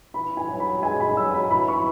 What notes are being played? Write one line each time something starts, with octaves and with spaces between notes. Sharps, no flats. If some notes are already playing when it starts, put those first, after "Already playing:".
E3 B5
G#5
F#3
B5
G#3 G#5
B5
F#3 E6
B5
E3 B5
C#6